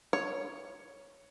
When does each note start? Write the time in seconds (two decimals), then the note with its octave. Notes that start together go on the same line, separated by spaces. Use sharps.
0.13 C#5